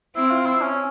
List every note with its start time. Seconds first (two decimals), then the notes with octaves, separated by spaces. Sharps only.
0.16 C4 E4
0.31 F4
0.46 E4
0.61 C#4